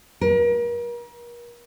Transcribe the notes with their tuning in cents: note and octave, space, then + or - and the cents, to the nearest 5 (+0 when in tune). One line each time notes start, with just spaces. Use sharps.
A#4 +40